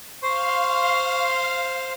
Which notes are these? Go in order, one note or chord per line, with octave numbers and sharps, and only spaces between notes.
C5 F5 C6 C#6